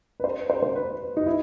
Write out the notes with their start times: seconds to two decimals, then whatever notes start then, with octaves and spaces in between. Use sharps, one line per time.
0.20 B4
0.24 C5
0.50 C5
0.63 C5
0.75 B4
1.17 D#4
1.26 E4